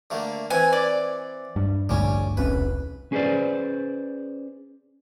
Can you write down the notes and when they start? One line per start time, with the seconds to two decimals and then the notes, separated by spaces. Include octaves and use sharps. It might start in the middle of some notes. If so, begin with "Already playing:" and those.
0.10 D3 A3 A#3
0.50 E3 C4 B4 G#5
0.73 D5
1.56 G2
1.89 A1 D2 G2 G3 C#4
2.37 E1 C2 C#4 B4
3.12 C#4 G#4 B4 C5 D5